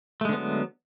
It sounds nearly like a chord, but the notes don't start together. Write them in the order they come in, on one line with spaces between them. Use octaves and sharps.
A3 G#3 D3 B3 F#3